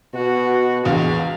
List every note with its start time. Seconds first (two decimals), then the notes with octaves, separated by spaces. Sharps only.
0.14 B2 F#4
0.85 A#1 E2 G#3 F5